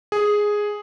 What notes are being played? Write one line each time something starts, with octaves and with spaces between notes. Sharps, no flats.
G#4